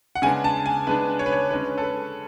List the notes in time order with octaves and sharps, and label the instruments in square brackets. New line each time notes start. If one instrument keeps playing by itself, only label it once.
[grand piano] F#5
C#3 G#3 B3 D4 G#5
A5
G#5
C#3 G#3 B3 D4 B4
C#5
B4
C#5
D3 G#3 C#4 B4
A4
B4